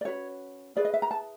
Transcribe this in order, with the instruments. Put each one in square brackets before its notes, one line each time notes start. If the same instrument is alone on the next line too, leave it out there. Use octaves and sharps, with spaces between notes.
[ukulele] D5
C#4 F#4 B4 C#5
E4 G#4 B4 D5
D#5
E5
A#5
A5